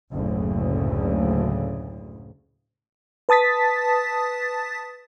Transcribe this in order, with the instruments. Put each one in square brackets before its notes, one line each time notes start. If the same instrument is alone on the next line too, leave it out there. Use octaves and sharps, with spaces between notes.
[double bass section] F#1 D2 A2 C#3
[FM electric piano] B4 A5 D#6 A6 B6